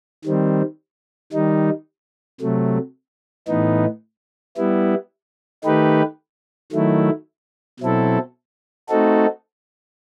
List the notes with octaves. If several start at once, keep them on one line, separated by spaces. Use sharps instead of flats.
D#3 G3 C4
D#3 G3 D#4
C3 F#3 A3
A2 E3 B3 D#4
G3 B3 E4
D#3 A3 D#4 G4 B4
D#3 F#3 A3 E4
B2 F#3 C4 E4 A4
A3 C4 D#4 F#4 A4